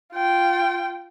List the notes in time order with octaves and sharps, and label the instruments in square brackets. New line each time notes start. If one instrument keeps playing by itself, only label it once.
[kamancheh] F4 G5